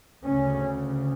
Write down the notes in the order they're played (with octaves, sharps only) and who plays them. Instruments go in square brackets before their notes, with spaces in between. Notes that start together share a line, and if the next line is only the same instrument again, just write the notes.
[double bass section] D2 C#3 C#4